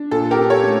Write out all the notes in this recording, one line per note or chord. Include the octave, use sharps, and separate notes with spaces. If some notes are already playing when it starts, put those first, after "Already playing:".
Already playing: D4
A#2 A4
G4 A#4
C#4
A4 C#5
A3